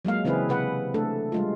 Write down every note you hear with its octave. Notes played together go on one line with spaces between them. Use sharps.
F#3 G#3 A#3 F5
C#3 E3 C4 E4 G#4 B4
C3 B4 F#5
A3 D4 A4
G3 G#3 F4